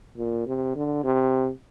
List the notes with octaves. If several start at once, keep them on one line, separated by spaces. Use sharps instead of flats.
A#2
C3
D3
C3